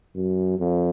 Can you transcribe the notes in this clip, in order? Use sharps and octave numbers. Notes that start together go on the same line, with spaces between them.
F#2
F2